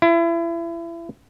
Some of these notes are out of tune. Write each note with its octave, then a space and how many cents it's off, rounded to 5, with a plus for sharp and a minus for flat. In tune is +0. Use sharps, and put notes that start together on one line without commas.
E4 +30